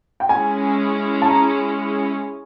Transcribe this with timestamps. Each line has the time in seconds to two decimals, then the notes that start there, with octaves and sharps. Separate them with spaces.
0.20 G5
0.29 G#3 C#4 E4 G#5
1.22 A5
1.30 A#5